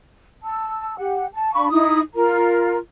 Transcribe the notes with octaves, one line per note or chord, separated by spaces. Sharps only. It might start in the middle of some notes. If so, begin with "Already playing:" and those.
A5 E6
G4 F#5
A5
D4 F5 B5 C#6
D#4 E4 D#6
F4 A#4 A#5